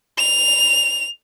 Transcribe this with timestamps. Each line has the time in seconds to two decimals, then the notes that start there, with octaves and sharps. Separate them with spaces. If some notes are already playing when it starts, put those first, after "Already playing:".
0.18 F7